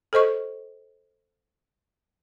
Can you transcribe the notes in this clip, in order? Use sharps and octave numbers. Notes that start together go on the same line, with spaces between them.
A4 C5 D#5 C#6